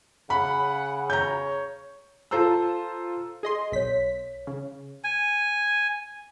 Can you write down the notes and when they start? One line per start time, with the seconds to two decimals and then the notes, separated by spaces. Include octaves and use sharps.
0.30 C#3 F#5 B5
1.10 C#5 A#5 G6
2.31 F4 A4 C5 A#5 E6
3.43 G#4 A4 D#5 C6
3.72 B1 A#4 C#5 B6
4.47 C#3
5.04 G#5